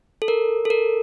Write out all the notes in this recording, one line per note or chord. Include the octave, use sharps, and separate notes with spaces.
A4
A#4
A4
A#4